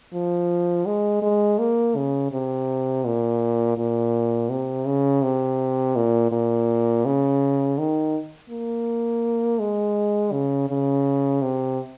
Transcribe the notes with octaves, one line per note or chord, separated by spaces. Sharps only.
F3
G#3
G#3
A#3
C#3
C3
A#2
A#2
C3
C#3
C3
A#2
A#2
C#3
D#3
A#3
G#3
C#3
C#3
C3